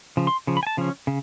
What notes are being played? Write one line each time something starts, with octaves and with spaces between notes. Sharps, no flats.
C#3 F3
C6
C#3 F3
B5
G#5
A5
C#3 F3 C#4
C#3